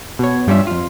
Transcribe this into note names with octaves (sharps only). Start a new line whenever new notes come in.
B2 C#5
G2 G3 C#4 F4 E5
F2 F4